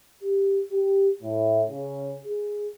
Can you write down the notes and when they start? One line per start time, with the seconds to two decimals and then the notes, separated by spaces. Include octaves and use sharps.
0.23 G4
0.70 G4
1.22 A2
1.68 C#3
2.25 G#4